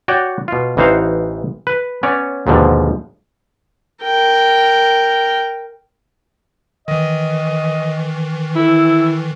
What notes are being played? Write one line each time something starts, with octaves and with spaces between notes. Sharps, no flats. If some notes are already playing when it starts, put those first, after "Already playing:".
F#4 C#5 D5 F#5 G5
B2 F4
A1 E3 D#4 C5 F5 F#5
B4
B3 C#4 C#5 D5
D#2 G#2 B2 D3 F3
A#4 G5
D#3 E3 D#5
E4 A4